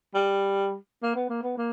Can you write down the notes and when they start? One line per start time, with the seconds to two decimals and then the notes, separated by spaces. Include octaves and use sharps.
0.15 G3
1.02 A#3
1.15 B3
1.30 A#3
1.43 B3
1.57 A#3